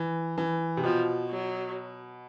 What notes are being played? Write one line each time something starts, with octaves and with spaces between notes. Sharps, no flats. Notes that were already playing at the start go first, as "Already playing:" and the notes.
Already playing: E3
E3
C3
B2 F3
F#3